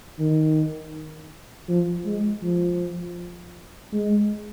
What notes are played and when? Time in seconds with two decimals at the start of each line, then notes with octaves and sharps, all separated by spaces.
0.19 D#3
1.69 F3
2.06 G#3
2.43 F3
3.93 G#3